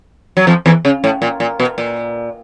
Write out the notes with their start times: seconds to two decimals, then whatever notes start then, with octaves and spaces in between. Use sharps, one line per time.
0.37 F#3
0.47 F2 F3
0.66 E2 E3
0.85 C#3
1.04 A2
1.22 A#2
1.40 A#2
1.60 B2
1.78 A#2